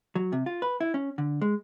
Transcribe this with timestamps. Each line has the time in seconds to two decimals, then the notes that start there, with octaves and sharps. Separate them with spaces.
0.15 F#3
0.33 C3
0.46 F4
0.62 B4
0.80 E4
0.94 C#4
1.18 D3
1.42 G#3